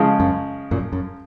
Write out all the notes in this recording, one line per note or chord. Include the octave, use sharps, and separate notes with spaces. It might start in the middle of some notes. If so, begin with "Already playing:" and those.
Already playing: C#3 F3 G#3
F#2
F#2 A#2
F#2